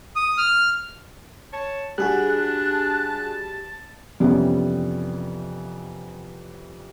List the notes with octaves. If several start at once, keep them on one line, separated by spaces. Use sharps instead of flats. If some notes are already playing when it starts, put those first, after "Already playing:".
D#6
F6
C#5 A5
G3 D4 F#4 G#4 A5 F#6
F2 C3 E3 G3 B3 C#4